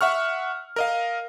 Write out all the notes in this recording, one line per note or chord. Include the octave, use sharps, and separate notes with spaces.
E5 F#5 C#6 F6
A#4 D#5 F5